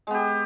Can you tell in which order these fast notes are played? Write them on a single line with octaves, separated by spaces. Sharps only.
G#3 B3 G4